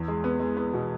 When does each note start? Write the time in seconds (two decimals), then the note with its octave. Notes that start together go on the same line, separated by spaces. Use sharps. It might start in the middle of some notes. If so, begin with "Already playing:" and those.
Already playing: E2
0.08 G#3
0.24 B3
0.40 G#3
0.57 B3
0.73 B2